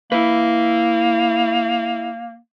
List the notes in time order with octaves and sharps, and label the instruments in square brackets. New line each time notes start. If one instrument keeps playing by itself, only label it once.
[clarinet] A#3 [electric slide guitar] E4 B4